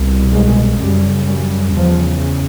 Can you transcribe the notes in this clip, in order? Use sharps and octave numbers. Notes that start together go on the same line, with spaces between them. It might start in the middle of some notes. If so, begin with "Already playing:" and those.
Already playing: C2 B2
G#3
F#2 C#3 G3
G3
E2 C#3 F3